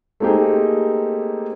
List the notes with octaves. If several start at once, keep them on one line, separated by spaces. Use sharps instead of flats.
A3 A#3 C4 D#4 G4 G#4